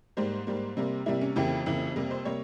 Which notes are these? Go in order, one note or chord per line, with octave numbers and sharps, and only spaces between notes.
G#2 G3 A#3 C5
G#2 G3 A#3
C3 G3 A#3
C3 G3 A#3 E4
C#4
F2 C#3 E3 A#3 G4
F2 C#3 E3 A#3
F2 C3 G3 A#3 A#4
C5
C3 G3 A#3 C#5